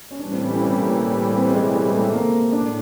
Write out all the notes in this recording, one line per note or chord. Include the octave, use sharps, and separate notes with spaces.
C#4
A2 E3 G3 D4
C4
C#4
C#4
C4
A#3
C4
G#3
G#3
A3
A#3
A2 D4